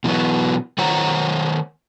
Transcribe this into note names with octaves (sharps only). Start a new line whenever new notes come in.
B2 E3 F#3 B3
D#3 C5 C#5 F#5 A#5